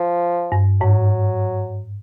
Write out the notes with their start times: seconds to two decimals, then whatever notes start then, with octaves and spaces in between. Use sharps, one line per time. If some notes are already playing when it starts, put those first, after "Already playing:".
Already playing: F3
0.52 G2
0.81 G#2 F#3